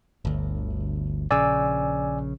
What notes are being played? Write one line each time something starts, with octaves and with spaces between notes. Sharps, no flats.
G1 D2
A#1 C#3 D5 G#5 E6